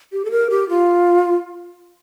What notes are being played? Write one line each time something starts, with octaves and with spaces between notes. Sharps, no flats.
G4
A4
A#4
G4
F4